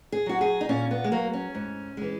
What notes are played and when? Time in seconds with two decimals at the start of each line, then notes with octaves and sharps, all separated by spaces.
0.12 G#4
0.26 F#3 F#4
0.41 G#4
0.61 D#4
0.69 A#2 C#4
0.91 B3
1.04 G#3
1.12 F#3 A#3
1.33 C#4
1.55 G#2
1.97 E3 G#3